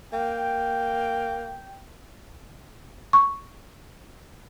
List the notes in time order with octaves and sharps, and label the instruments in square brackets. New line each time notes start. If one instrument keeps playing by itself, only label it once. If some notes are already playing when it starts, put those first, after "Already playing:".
[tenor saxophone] A#3 [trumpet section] G5
[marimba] C#6